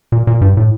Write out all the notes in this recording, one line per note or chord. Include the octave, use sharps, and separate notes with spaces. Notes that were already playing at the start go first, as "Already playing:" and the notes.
A#2
A#2
G2
A2